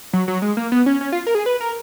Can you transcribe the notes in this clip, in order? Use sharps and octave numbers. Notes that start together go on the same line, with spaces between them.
F#3
F#3
G#3
A#3
B3
C#4
C#4
F4
A#4
G#4
B4
A#4